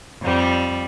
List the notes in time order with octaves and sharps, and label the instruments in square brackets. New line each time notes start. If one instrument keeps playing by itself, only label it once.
[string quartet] F2 G3